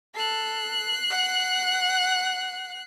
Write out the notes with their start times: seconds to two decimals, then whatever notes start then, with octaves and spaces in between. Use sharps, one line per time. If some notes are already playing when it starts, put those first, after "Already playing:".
0.15 A4 F#6 C7
1.10 F#5